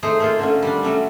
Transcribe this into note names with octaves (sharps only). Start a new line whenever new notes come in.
A3 D#4 G#4 C5
A3 A#3 F4
D3 A3 C#4
G3 D4
F#3 A3 C#4